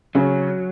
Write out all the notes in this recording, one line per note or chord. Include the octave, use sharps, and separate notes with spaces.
C#3 F#3